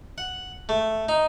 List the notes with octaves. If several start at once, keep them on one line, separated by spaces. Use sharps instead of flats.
F#5
A3
D#4